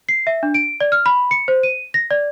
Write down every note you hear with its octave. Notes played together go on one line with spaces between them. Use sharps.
C7
E5
D4
D7
D5
F6
B5
C#7
C5
D#7
A#6
D5